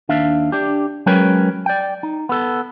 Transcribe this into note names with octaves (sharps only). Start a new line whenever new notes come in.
D#2 D4 E5 F5
D4 G4
F#3 G#3 C#4 A#4 B4 G5
D5 G5
D#4
B3 A4